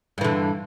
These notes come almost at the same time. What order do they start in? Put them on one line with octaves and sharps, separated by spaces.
G2 E3 D3